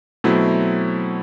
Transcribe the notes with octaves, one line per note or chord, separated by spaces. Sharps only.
B2 F#3 A3 C4 E4